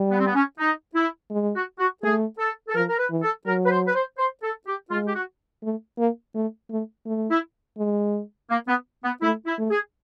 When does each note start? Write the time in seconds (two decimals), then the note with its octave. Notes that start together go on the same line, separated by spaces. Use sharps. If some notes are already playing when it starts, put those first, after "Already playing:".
Already playing: G3
0.11 B3
0.19 C4
0.27 B3
0.35 C#4
0.59 D#4
0.95 E4
1.30 G#3
1.55 F#4
1.79 F#4
2.03 A3 G#4
2.38 A4
2.68 A4
2.75 F3 A#4
2.89 A#4
2.99 B4
3.10 E3
3.22 A4
3.46 F#3 A#4
3.65 B4
3.71 C5
3.87 B4
3.95 C5
4.18 C5
4.43 A4
4.67 G4
4.90 G#3 F4
5.06 G4
5.14 F#4
5.63 A3
5.98 A#3
6.35 A3
6.70 A3
7.06 A3
7.30 E4
7.78 G#3
8.50 A#3
8.68 B3
9.04 B3
9.22 A3 E4
9.46 E4
9.58 A3
9.70 G#4